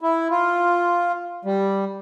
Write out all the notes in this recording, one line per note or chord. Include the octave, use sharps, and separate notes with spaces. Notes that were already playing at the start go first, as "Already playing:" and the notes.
E4
F4
G3